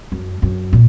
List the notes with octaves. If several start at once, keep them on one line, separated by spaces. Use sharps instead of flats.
F#2
F#2
A#2